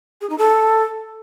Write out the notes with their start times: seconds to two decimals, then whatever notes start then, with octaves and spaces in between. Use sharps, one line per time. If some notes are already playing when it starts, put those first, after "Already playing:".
0.21 G#4
0.30 D#4
0.38 A4